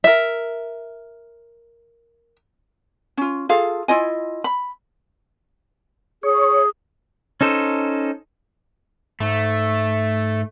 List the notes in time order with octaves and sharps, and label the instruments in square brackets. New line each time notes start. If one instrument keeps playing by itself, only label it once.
[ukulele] A#4 E5
C#4 F4
F4 G#4 A4 F5
E4 F4 D#5 G#5
B5
[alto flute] G#4 [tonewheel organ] C#5
[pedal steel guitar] C#4 D#4 A4 C5
[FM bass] G#2 [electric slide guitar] A3